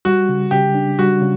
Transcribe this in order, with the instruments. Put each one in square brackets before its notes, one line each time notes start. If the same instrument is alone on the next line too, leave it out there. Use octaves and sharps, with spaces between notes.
[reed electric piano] G3 [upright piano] F#4
[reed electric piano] C#3
[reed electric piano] C#3 [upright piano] G4
[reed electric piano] D4
[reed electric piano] G3 [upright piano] F#4
[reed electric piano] C#3